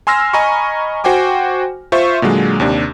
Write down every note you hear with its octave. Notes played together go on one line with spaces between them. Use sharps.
G#5 C6 E6 F6 A#6
D#5 G#5 A#5 B5 C#6
F#4 C5 G5 G#5 D6
F4 C5 E5 C#6
A#2 D3 F#3 G#3
D#2 C3 D4